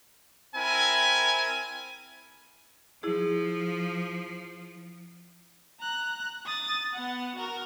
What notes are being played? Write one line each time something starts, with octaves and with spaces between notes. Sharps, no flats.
C4 E4 A#4 G#5
F3 E4 G#4
A#5 F#6
D#6 A6
B3 F#5
F#4 A#4